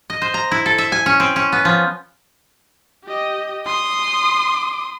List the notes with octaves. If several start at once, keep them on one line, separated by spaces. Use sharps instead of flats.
D#5
C5
A#5
E4
A4
E5
G#5
C#4
C4
C#4
B3
F3
G4 D#5
C6 D#6